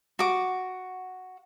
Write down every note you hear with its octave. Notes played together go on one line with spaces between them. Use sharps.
F#4 D6